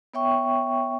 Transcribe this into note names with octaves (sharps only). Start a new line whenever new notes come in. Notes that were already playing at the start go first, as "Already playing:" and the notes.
B3 C#5 E5 G5 C#6